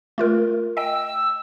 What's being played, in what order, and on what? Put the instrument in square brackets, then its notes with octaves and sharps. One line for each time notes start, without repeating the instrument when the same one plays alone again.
[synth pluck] A3 F4 A#4
[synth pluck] D#5 G5 [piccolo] E6